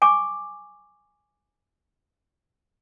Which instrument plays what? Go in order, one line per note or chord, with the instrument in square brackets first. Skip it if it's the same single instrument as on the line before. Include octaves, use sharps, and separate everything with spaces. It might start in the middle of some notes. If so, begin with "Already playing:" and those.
[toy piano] G#5 C#6 D6